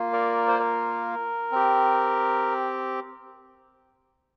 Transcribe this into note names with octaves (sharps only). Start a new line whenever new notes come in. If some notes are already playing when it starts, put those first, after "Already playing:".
Already playing: A#3 F4
A#4 D5
C5
A#4
C4 G4